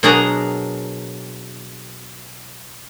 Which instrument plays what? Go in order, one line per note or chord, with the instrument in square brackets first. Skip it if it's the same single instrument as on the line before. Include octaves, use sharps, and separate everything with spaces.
[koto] B2 F#3 D4 G#4 A#4 A#5